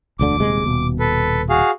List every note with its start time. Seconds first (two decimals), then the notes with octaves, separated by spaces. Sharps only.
0.19 E1 D2 D3 D6
0.40 D#1 C3 G#3
0.64 D#1 B2
0.99 A4 B4
1.49 F#4 G#4 F5